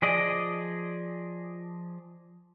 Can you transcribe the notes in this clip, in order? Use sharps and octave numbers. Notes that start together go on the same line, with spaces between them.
F3 G#4 D5 D#5